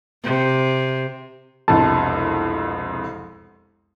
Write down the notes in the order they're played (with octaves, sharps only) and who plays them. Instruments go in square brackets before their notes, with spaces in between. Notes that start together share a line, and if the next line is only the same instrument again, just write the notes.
[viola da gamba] C3
[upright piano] E1 C2 F2 [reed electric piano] A5